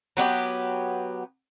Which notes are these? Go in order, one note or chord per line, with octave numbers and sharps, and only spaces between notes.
F#3 B3 D#4 G4